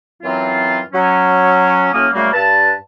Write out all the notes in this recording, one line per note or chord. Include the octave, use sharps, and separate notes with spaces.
F#2 E3 F#3 C4 F4
F#3 C#4
A2 F#3 A#3 C#4 D#6 F6
C#3 F#3 G3 A3 A#3
G2 B4 A5